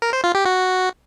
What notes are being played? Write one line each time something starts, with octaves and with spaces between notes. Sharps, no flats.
A#4
C5
F4
G4
F#4